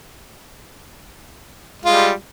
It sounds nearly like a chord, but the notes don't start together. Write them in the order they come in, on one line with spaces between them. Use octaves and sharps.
G#3 F4 G3